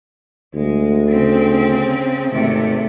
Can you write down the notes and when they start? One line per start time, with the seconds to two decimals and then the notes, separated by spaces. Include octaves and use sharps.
0.54 D2 G#3
1.10 C#3 C4
2.32 G#1 C3 A3